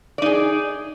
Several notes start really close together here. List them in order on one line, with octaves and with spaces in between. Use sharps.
D5 D#4 G#4